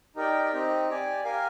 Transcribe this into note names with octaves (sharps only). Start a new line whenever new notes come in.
D#4 G4 A#4 D5 G5
C4 D#4 G4
G4 D5 G#5
G4 A#4 F5 G#5